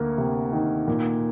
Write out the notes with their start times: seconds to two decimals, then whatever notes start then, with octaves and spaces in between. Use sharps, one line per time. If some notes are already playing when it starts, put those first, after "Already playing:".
Already playing: D2 A#3
0.18 C3
0.53 D#3
0.88 A#2